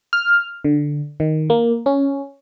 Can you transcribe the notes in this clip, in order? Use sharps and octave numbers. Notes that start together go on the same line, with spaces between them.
F6
D3
D#3
A#3
C#4